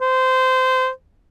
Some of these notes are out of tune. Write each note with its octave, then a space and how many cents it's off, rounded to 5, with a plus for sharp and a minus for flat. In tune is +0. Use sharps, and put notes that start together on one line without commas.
C5 -20